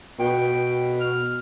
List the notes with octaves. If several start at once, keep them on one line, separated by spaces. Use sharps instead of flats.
B2 G5
F6